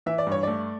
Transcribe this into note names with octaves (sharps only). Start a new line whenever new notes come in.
E3 E5
D5
G2 C#5
A3 D5